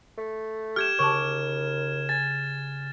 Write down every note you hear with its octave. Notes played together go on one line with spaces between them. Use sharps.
A3
G4 F6 G#6 E7
D#2 C#3 A5 C#6 D6 F#6
G#5 A6